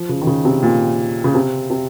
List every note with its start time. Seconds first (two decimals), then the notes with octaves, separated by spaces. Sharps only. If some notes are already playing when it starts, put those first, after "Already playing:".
Already playing: F3
0.09 C#3
0.21 D#3
0.27 C#3
0.45 C3
0.63 A#2
1.24 C#3
1.35 C3
1.70 C3